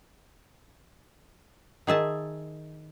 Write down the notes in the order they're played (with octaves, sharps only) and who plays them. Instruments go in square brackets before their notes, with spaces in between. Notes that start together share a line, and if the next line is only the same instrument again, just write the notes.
[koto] D#3 G#4 E5 A5